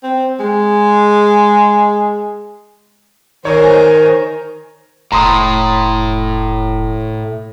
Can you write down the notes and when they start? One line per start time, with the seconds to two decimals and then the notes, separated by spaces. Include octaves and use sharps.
0.03 C4
0.40 G#3
3.45 D#3 A#4 C5 C#5 D#5 G#5
5.12 F1 A2 A#5 C6 D#6